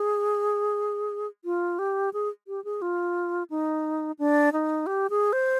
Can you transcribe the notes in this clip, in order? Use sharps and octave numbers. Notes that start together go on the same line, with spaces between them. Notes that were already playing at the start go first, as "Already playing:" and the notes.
Already playing: G#4
F4
G4
G#4
G4
G#4
F4
D#4
D4
D#4
G4
G#4
C5